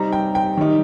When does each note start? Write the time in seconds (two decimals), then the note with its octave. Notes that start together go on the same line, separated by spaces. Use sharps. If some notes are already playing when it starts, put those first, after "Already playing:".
Already playing: C3 G3 C4 D#4 A#5
0.13 G5
0.35 G5
0.57 D#3 G3 D#4